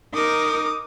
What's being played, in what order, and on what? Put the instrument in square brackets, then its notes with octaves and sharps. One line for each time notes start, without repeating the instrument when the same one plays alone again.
[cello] D#4 A#4 [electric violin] D6 D#6